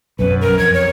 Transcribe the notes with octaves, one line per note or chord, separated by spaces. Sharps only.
B1 F#2 B4
A#4
F2 G#6
C#5